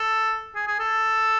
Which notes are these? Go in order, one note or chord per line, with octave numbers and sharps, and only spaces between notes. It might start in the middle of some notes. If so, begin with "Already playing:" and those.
Already playing: A4
G#4
G#4
A4